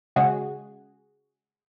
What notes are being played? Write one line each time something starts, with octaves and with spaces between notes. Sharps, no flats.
C#3 G#3 F#4 G#4